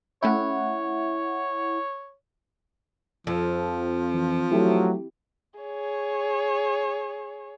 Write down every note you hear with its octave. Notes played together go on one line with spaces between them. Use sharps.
A3 C#4 E4 C#5 F#5 G5
F2 F3
E3
F#3 A3 E4 G4
G#4 C#5